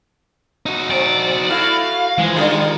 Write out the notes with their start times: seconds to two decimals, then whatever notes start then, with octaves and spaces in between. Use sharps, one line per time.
0.66 D#4 F#4
0.90 C4 D5
1.50 A3 E4 F#4 F5
2.19 E3 F3 G#3
2.36 D#3 G3 D4 F4